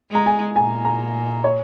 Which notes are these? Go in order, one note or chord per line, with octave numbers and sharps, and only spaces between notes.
G#3 A#5
G#5
A#2 G#5
A#5
C#5